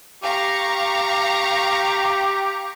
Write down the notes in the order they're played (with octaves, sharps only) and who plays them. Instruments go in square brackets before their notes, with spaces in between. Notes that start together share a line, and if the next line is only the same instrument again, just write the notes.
[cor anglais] G4 [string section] F5 A#5 C#6